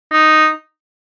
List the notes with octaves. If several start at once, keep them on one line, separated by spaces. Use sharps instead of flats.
D#4